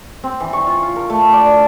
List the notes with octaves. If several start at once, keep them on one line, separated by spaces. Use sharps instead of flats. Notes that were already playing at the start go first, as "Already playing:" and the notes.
C4
E3
C#6
F4
F4
A#4
A3
D5
A5